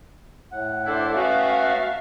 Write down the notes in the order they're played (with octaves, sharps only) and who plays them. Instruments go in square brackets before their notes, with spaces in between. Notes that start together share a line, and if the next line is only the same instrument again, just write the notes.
[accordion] A2 F#5
[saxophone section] D4 E4 [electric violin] A4 C5
[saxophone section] A3 B3 F#4 [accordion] C#4 [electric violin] E5 F5